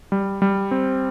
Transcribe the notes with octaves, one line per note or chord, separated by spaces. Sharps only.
G3
G3
C4